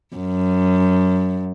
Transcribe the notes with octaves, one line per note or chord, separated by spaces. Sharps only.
F#2